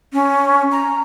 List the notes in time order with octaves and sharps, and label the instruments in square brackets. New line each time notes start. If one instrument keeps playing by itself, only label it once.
[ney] C#4
A#5